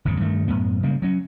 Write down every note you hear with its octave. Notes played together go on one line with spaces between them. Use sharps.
G1 E2 A2 C#3
G2 D#3 A3
F#2 A2 B3
C#3 G3 G#3 A#3
F#3 C#4